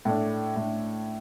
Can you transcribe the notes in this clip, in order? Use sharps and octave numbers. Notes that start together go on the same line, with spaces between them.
A2 A3 D4
A2 A3 D4